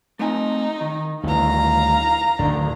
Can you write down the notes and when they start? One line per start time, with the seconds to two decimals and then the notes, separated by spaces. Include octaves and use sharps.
0.19 A3 C4 D#4 G#5
0.81 D#3
1.24 D2 G2 D#3 E3 F5 A#5
2.39 D1 D3 D#3 D4